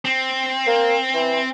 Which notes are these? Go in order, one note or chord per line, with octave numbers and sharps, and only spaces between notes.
C4
A#3
E3